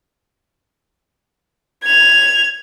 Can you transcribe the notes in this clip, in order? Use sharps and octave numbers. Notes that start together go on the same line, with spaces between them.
G#6 F7